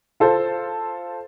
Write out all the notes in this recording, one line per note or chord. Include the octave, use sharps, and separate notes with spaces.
F4 A4 C5